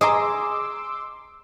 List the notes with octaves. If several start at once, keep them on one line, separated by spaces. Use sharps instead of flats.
G#4 D#5 A#5 C6 D6 E6